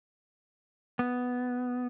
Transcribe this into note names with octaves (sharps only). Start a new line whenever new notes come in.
B3